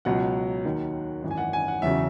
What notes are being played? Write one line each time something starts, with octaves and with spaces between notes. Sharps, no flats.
C#2 B2 F#3 F#5
D#2 D#3 F#3
G#1 F#2 E3
G#5
F#5
G#5
F#5
E1 E2 C#3 F#3 E5